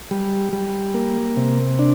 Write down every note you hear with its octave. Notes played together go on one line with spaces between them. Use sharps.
G3
G3
A#3
C3
D4